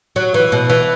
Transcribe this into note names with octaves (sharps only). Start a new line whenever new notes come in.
F#3
E3
B2
E3